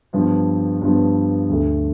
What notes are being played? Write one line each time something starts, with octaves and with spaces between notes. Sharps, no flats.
G2 F3 B3
G2 F3 B3
D2 D3 A3